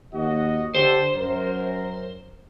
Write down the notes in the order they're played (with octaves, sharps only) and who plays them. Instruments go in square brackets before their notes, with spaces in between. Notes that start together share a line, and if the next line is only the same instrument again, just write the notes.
[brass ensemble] D#2 F#4 D#5
[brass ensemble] D3 G4 A4 [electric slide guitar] C5
[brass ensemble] F#2 A#4